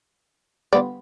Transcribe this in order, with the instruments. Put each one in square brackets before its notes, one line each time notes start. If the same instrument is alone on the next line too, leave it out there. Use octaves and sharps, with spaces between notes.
[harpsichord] D3 G3 B3 F4 [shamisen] D5